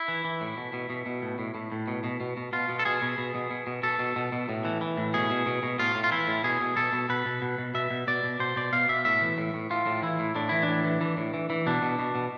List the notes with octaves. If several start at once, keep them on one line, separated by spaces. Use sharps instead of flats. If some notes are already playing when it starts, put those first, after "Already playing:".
Already playing: E4
E3
E3
A2
B2
B2
B2
B2
A2
A2
A2
A2
B2
B2
B2
B2
B2 F4
B2
A4
B2 G#4
B2
B2
B2
B2
B2
B2 A4
B2
B2
B2
A2
E3
E3
A2
B2 G#4
B2
B2
B2
A2 F4
A2
F4
E3 E4
A2
B2 G#4
B2
B2 A4
B2
B2 B4
B2
B2
B2
B2 E5
B2
B2 D5
B2
B2 C5
B2 D5
B2 F5
B2 E5
A2 E5
E3
A2
A2
A2 F4
A2
E3 E4
A2
A2 D4
E3 E4
D4
A2
E3
E3
A2
E3
E3
B2 D4
B2
B2
B2